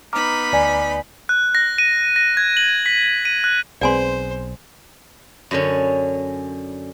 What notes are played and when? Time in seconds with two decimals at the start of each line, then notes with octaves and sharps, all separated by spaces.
0.13 B3 D#4 A#5 B5 D6 F6
0.53 D2 D5 G#5
1.29 F#6
1.55 A#6
1.78 D#7
2.16 A#6
2.37 G#6
2.57 F#7
2.86 B6
3.25 D#7
3.44 F#6
3.81 B1 G#3 C4 B4 C5 D5 G#5 C6
5.51 F#2 D3 C#4